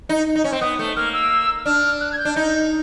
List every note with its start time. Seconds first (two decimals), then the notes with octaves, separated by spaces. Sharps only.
0.09 D#4
0.36 D#4
0.44 C#4
0.52 C4
0.61 B3 D#6
0.79 A3
0.96 A#3 F6
1.13 E6
1.66 D4 F6
2.01 F#6
2.12 G#6
2.18 G6
2.25 D4
2.35 D#4 G6